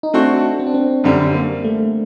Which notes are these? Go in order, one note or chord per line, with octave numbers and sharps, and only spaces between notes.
D#4
A3 C4 D4 F#4
C4
D4
C4
F#2 D3 G3
A#3
A3